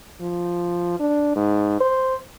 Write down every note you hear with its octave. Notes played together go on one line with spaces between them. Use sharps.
F3
D4
G#2
C5